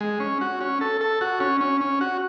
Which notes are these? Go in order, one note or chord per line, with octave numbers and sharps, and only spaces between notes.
G#3
C#4
F#4
C#4
A4
A4
F#4
C#4
C#4
C#4
F#4